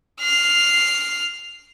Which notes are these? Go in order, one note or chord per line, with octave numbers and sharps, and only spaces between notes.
F6 C7